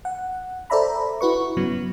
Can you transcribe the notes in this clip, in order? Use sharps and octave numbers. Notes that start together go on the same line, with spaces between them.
F#5
A4 C5 D5 E5 A#5 B5
E4 F#4 B4 C#6
G2 C#3 F#3 B3